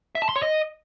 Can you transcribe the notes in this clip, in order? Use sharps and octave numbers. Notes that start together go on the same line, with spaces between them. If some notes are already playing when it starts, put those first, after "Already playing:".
E5
A5
C6
C#5
D#5